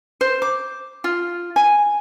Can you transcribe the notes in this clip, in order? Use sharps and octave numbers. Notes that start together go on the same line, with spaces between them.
C5
D6
F4
G#5